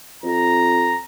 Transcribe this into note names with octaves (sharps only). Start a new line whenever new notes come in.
F2 A#5